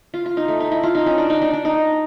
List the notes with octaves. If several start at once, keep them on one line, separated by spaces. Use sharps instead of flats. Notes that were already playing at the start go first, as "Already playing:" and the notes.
F4
F4
D#4
A3
D#4
E4
F4
D#4
C#4
D4
D#4
D4
D4
D#4